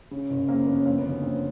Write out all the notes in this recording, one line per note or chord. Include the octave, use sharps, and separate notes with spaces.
C#3
F#1
C#3 A#3 C4
F#1 B3 C#4
F3 A#3 C4
B3 C#4
D2
B3 C#4
D3 A#3 C4